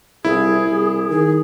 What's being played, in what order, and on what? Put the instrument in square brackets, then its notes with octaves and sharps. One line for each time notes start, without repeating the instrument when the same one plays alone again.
[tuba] C2 [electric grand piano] E4 [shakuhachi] G#4
[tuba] C2
[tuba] D#3 [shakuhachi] G#4